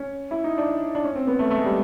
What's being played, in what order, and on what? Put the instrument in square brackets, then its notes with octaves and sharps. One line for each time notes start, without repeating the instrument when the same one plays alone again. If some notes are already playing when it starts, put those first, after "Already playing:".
Already playing: [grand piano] C#4
E4
D#4
D4
D4
C#4
C4
B3
A3
A3
G#3
G3